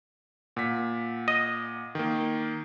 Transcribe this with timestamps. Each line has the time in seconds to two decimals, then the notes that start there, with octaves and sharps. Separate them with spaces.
0.57 A#2 F#5 B6
1.28 D#5
1.95 D#3 A#3